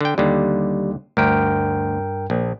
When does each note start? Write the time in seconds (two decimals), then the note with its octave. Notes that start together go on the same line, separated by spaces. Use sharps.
0.01 D3 G5
0.18 D#2 D3 G3
1.17 D2 G2 A#4 G5
2.30 A#1